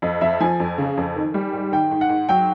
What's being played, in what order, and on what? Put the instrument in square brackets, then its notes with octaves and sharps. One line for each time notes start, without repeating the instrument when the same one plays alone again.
[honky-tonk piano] F2 [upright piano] D#5
[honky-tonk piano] F2 [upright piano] E5
[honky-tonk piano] F3 [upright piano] G#5
[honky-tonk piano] F2
C#3
F2
D#3
G3
G#2
[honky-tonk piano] D#3 [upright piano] G5
[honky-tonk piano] G#2
[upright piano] F#5
[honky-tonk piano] G#2
[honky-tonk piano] F#3 [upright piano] G5